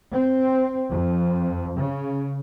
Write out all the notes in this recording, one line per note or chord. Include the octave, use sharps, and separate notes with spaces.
C4
F2
C#3